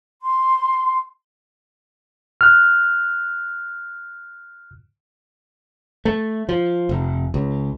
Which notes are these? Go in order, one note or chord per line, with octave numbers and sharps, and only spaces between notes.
C6
F6 F#6
A3
F3
F1
C#2